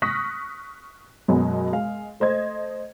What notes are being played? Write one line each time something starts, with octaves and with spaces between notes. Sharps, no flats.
C#6 D#6 F6 F#6 A#6 B6
F#2 B2 F#3 G#3 B3
G#3 F5
A3 C5 D#5 G#6